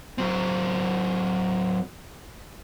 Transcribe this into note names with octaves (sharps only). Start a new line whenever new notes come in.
F#3 C4